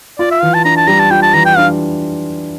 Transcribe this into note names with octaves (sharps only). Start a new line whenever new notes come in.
F4 D5
E5
E3 F5
A5
D4 A#5
A5
G3 A#5
A5
F4 G5
A5
E3 A#5
G5
D4 F5